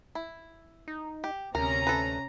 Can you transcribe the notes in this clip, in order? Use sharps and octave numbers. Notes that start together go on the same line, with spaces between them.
E4
D#4
G4
D2 C3 C#4 A#4 A#5
A4 B4